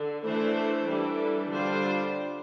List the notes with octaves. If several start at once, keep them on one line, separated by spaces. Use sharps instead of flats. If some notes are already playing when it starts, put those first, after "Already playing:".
Already playing: D3
E3 A3 D4 A4 C5
E3 G3 D4 A4
D3 G3 D4 F4 C5